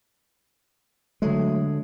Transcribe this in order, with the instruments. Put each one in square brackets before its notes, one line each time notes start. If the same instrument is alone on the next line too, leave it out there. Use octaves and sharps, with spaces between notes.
[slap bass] D3 G#3 [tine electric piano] F#3 A3